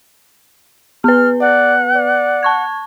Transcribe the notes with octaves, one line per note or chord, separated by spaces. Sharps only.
B3 B4 F6
D5 F#5
D5
A5 C#6 G#6